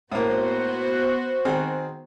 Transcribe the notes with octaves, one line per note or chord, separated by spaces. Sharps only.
A2 A#3 B3 F#4 C5
D#3 C4 G#4